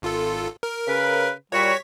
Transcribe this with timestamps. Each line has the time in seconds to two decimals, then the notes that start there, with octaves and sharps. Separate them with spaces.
0.02 G#1 F4 A4
0.63 A#4
0.87 C#3 B4
1.52 A#2 G3 F#4 C#5 C#6 B6